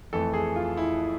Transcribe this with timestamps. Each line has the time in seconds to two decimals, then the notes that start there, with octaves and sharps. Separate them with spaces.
0.13 F2 E3 A3 A4
0.34 G#4
0.56 F4
0.77 E4